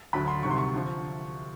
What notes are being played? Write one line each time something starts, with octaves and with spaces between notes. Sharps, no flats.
D2 D3 F#3 B5
C6
C2 C3 D#3 F#3 C#6
C6
C#6
D3 F3